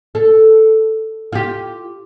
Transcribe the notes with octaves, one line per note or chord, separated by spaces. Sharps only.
A4
F4 G4